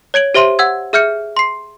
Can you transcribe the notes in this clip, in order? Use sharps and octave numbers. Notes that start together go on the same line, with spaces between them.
C#5 G#6 D7 F#7
G4 C5 E5 C6 D#7
F#5 E6 G#6
G#4 E5 F6 G6 C#7
C6 C7